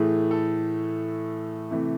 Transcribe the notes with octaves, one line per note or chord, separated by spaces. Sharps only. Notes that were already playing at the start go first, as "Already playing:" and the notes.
Already playing: A2 E3 A3 G#4
A4
C3 E3 A3